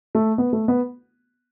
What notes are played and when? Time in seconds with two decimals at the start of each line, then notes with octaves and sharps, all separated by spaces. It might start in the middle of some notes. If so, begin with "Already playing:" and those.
0.15 A3
0.38 B3
0.53 A3
0.68 B3